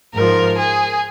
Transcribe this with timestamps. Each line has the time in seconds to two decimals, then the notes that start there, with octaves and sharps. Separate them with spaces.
0.14 G#2 F3 A#4
0.57 G#4